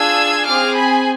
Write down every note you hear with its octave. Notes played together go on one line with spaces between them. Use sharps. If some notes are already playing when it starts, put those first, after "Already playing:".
Already playing: D4 F4 G#4 E6 G#6
C4 G#4 D6 F6
G#5 B5